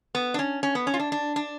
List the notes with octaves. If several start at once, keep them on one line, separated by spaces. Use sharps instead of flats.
B3
D4
C#4
C#4
B3
C#4
F4
D4
D4
D4